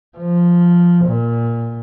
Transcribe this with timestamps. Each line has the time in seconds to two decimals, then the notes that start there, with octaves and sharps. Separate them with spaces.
0.17 F3
1.05 A#2